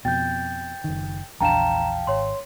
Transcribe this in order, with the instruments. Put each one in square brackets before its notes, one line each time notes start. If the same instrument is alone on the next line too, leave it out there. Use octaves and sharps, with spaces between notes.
[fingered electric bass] F2 B2 [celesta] G5 [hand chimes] G6 A6
[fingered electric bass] F#1 D#3
[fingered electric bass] A#1 E2 D4 [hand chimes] F5 G5 A5 [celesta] A#5 E7
[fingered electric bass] G#1 [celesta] C#5 C6